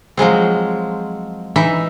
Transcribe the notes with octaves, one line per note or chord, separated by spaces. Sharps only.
F3 F#3 G#3 C4
E3 D#4 E5